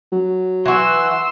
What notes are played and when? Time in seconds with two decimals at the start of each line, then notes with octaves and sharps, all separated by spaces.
0.12 F#3
0.66 E3 F#4 C6 E6